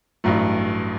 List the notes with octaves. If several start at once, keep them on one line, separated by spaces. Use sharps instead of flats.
A1 G2 F#3 A3